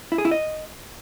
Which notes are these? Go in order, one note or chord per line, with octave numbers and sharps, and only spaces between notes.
E4
G#4
E4
D#5